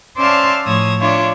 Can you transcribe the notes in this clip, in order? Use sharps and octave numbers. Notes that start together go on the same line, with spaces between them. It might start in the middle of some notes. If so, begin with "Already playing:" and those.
C#4 C5 D5 E5 F5 A5
A2 F3 C#5 D#6 E6
D4 F4 C#5 D5 E5